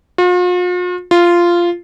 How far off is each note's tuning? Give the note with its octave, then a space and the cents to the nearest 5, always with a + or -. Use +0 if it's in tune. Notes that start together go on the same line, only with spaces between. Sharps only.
F4 +45
F4 -10